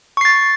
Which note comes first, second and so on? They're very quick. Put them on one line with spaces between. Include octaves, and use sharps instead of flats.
C#6 C7 A6